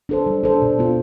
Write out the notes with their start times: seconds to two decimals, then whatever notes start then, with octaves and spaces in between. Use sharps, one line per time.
0.09 D4 A4 C5
0.26 G3
0.43 D4 A4 C5
0.62 B2
0.79 B3 F4